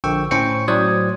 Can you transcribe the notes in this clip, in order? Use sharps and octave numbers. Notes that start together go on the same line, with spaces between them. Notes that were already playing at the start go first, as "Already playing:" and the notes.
A#1 D3 G5 C#6 E6
A2 C#4 C5 G5 C#6 C#7
A2 F#3 C5 D5 D#6 G#6